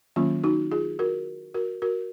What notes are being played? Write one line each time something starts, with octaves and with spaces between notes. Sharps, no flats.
D#3 F#3 A#3 C#4 F4
D#4 F#4
F4 G#4
F#4 A#4
F#4 A#4
F#4 A#4